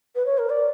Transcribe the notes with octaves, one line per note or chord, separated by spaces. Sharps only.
B4
C#5
A#4
D5